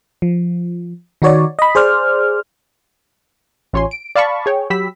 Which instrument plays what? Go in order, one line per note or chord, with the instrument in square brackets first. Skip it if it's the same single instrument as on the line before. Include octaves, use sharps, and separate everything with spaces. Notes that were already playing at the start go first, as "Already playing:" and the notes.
[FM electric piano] F3
D#3 D#4 F#4 C#5 D5
D#5 B5
G#4 C5 D5 F6
[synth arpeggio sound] A1 F4 C#5 G#5 C6
D7
D5 F5 A5 B5 C#6
G#4 C#5 G5
F#3 G4 B5 E6 B6